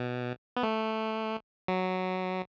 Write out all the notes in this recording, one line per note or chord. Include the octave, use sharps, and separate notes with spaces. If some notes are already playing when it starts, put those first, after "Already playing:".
Already playing: B2
B3
A3
F#3